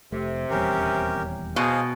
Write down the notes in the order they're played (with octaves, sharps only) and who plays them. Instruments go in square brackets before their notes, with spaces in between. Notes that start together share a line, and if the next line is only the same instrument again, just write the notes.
[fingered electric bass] F1 A3 [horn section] C3
[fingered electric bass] D#1 E2 G3 [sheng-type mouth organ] C#4 G4 A#4
[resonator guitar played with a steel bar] B2 [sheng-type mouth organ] G#4 F5 [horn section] C5 D#5